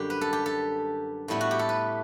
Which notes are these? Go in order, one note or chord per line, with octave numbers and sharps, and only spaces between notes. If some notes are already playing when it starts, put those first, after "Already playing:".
Already playing: F#2 D3 G3 G4
B4
A4
G4
A4
A2 G3 B3 E4
F#4
G4
A4
B4